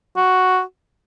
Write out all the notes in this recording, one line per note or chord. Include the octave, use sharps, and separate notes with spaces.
F#4